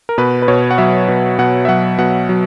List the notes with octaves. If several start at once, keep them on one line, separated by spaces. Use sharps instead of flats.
A#4
B2 B4
B4
B2 C#5
F#5
F#3 E5
B2
B2 F#5
E5
F#3 F#5
B2 F#5
F#3